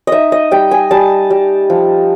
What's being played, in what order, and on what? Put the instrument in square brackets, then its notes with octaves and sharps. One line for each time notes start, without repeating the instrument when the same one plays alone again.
[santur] D#4 D#5 E5
D#5
G3 G5
G#5
G3 A5
G3
F3